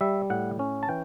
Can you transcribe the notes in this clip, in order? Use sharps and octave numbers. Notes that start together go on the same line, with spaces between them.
G3 E5
A2 F#5
C#4
A5
E3 G5